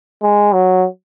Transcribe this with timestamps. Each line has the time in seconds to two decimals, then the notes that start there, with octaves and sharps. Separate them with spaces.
0.22 G#3
0.53 F#3